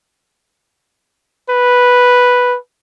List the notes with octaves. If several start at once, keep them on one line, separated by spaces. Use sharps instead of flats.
B4